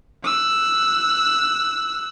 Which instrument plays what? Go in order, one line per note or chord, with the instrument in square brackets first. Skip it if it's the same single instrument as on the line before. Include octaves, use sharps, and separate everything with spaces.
[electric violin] E6 F#6